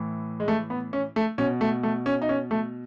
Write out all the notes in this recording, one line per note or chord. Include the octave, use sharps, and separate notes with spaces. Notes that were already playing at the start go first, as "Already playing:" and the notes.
Already playing: A2 E3
G#3
A3
B3
C#4
A3
B2 C#4
A3
A3
C#4
D#4
C#4
A3